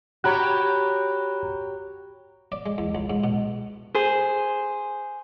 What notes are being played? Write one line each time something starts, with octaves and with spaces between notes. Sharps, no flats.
F#4 G4 C#5 A#5 B5 F#6
D5
G#3
E2
C#2
G#2
B2
G#4 C5